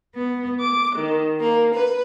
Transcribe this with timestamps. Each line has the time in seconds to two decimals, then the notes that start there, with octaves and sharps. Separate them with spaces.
0.14 B3
0.61 D6
0.95 D#3
1.40 A#3
1.73 B4